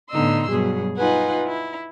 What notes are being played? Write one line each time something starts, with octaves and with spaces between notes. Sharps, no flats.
A2 D3 B3 D#4 C6 E6
G2 B2 F#3 G#4
D#4 F4 B4 F#5 G#5
E4